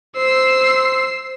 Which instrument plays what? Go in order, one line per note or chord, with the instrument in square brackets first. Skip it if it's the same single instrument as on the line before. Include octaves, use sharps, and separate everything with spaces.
[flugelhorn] C5 [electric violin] E6 C7